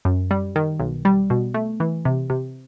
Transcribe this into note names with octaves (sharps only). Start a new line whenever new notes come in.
F#2
G3
D#3
B1
G3
B2
A3
E3
C3
C3